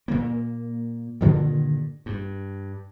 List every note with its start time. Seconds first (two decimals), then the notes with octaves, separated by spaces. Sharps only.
0.08 A#2 A#3
1.21 G2 A#2 D3 D#3
2.06 G2